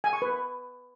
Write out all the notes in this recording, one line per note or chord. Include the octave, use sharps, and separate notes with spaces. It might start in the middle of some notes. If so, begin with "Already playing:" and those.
G#5
C#6
B4